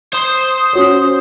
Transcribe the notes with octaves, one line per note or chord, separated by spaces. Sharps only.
C5 C6 D#6
C#4 F#4 C#5